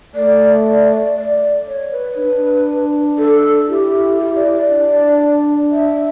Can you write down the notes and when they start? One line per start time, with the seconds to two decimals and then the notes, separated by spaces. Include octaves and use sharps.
0.15 A3 D5
0.66 D5
0.91 D5
1.15 D5
1.67 C#5
1.92 B4
2.17 D4
3.18 A4
3.69 E4 G4
4.19 G4
4.36 D5
4.53 D5
4.70 D4
5.71 E5